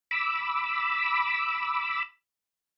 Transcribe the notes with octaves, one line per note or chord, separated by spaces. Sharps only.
B5 D6 E6